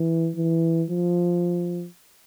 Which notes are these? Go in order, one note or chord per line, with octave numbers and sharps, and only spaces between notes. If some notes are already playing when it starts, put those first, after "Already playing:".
Already playing: E3
E3
F3